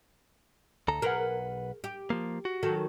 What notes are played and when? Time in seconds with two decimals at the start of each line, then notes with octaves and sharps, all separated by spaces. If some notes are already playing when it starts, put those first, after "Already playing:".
0.88 D2 A4 A#5
1.02 B1 G#4 A#4 B4 F#5
1.84 G4
2.10 F3 A#3
2.45 F#4
2.63 D#3 F#3 A4